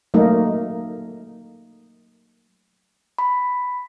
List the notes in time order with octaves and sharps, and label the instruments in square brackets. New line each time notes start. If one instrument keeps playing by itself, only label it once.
[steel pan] F#3 A3 A#3 D#4
[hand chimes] B5